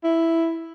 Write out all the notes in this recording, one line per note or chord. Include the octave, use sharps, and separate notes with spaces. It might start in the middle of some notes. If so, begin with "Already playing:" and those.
E4